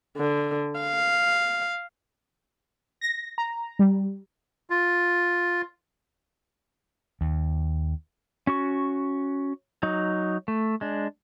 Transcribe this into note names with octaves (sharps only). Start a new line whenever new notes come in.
D3
F5
A#6
A#5
G3
F4
D#2
C#4 F#4 C#6
F#3 D#4
A3
G#3 D4